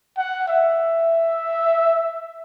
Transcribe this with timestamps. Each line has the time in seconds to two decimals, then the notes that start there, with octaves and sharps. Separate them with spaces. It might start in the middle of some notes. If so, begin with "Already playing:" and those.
0.17 F#5
0.48 E5